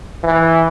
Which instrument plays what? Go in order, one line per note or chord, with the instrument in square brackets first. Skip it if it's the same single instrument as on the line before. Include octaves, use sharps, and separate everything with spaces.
[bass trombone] E3